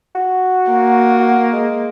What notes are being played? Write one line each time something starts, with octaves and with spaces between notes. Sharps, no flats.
F#4
A#3
F#4
G#3